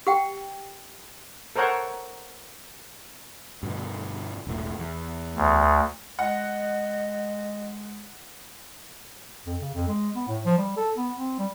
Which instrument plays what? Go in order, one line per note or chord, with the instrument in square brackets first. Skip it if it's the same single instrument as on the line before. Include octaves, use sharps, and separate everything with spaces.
[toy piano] G4 F#5 G5
[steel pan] A4 A#4 C5 C#5 F#5
[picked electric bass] G2 B2 D3
E1 B1 A2
E2
[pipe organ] D2
[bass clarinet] G#3 [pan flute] D#5 [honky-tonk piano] F#5
[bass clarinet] F2
C#3
F2
G#3
B3
A2
F3
G3
A4
B3
C4
G3